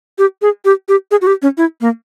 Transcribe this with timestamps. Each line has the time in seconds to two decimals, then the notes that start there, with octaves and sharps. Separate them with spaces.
0.18 G4
0.42 G#4
0.65 G4
0.88 G4
1.11 G#4
1.21 F#4
1.27 G4
1.42 C#4
1.57 E4
1.81 A#3